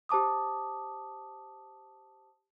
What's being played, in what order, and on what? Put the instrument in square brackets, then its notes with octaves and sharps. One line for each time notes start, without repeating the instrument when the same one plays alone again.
[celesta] G4 C5 A5 D6 D#6